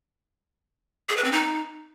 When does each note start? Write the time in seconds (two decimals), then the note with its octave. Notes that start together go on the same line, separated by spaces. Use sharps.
1.09 G#4
1.17 B4
1.24 C4
1.32 D#4